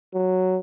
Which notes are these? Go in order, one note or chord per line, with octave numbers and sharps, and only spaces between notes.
F#3